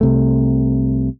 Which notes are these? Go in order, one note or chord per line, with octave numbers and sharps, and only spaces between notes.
C2 C3 A3